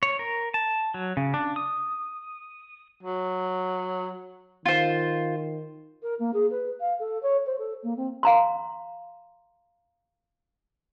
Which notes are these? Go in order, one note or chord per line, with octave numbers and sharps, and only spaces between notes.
C#5
A#4
A5
F#3
C#3
D4
D#6
F#3
D#3 F4 C5
A#4
A#3
G#4
B4
F5
A4
C#5
C5
A4
A#3
C4
F5 A#5 C6